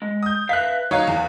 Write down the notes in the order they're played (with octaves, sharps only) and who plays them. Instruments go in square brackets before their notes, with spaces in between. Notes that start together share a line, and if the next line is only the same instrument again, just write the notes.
[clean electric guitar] G#3
[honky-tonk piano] D#6 G6
[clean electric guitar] B4 E5 F5 [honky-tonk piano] F#6 B6
[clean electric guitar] C2 F5 [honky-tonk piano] F#3 D#4 C#5
[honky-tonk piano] E2